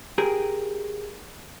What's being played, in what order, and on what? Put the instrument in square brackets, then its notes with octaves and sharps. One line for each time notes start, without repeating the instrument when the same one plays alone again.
[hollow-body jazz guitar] G4 G#4 A#4 G#5